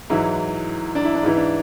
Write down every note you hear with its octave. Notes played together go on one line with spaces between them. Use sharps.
G#2 E3 F#3 E4
D4
E4
D4
G#2 E3 E4
D4